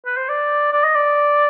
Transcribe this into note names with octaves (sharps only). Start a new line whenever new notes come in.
B4
C5
D5
D5
D#5
D5